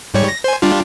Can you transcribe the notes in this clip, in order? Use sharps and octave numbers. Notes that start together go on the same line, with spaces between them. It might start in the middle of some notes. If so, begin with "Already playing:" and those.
G#2 G3 C#5
A#6
C5 G#5
G3 D4 F4